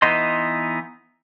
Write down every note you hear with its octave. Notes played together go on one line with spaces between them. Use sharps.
E3 B3 D#4 D#5 C6